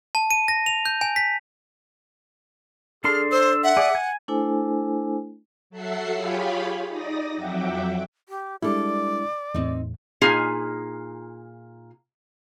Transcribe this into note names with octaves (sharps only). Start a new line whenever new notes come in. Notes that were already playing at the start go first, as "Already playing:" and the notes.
A5
D#7
A#6
F7
G6
G#5
B6
D4 G#4 A4 C6 F6
C5 E6
E5 F#5
G#4 D5
G#5
A3 D4 E4 A4 C5 G#5
F#3 A4 E5 F#5 C7
F4 G4 G#4 C#5 F5 B5
D#4 D5 D#6 A#6
F2 F#3 E5 F#5 G5 D6
G4
G3 G#3 D4 E4 A4 D5
E2 A2 C4 D#4
A#2 D#4 F4 G#4 G#5